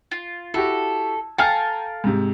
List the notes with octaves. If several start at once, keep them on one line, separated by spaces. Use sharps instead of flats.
F4
E4 F#4 G4 A4
A4 F5 G5 G#5 A#5 F6
G#2 C3